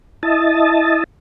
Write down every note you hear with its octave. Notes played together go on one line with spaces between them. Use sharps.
E4 D#5 A5